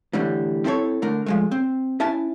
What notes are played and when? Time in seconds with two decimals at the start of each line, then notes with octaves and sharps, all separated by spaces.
0.13 A2 D3 E3 G3
0.65 C4 E4 A4 C#5
1.02 D3 A3 A#4
1.26 F3 G#3 A3
1.51 C4
2.00 C#4 E4 E5 G#5 A5